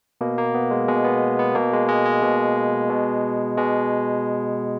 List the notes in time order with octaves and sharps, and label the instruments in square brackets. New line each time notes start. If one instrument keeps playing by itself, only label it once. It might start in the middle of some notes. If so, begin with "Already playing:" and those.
[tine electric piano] B2 A#3
A#3
B3
G#3
B2 G#3
B3
B3
B2 A#3
G#3
G#3
G#3
B2
B2
B2 G#3